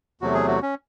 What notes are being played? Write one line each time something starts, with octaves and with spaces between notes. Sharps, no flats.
E2 C3 F#3 A3 F#4
G#4
F#4
C#4